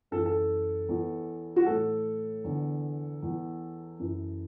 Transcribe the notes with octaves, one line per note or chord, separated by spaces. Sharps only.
F#2 E3 A4
A4
E2 E3
F#4
A2 E3 A4
E2 D3
E2 E3
F#2 E3